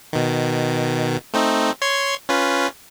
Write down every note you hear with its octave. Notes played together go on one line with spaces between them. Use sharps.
B2 D#3
A3 C4 D#4
C#5 C6 G#6
C#4 F4 B4